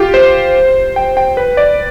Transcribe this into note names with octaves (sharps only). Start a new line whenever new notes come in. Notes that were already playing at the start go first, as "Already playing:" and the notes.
Already playing: F4 G4
C5
G5
G5
B4
D5